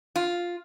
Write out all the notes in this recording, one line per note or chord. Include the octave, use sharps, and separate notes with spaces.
F4